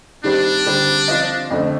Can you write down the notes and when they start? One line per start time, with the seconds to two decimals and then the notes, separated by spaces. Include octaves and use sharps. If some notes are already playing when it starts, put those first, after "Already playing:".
0.24 D#3 G3 C4 D4 G4
0.66 D3 G3 C4 G4 C5
1.08 F3 C4 F4 C5 D#5
1.51 F2 D3 A3 C4